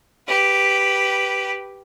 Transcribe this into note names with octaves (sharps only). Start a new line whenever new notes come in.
G4 B4